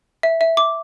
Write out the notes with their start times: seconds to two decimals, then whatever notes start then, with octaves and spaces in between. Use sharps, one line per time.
0.23 E5
0.41 E5
0.57 D6